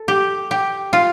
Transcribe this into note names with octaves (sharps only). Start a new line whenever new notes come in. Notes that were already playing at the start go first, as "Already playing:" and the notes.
Already playing: A4
G4
G4
F4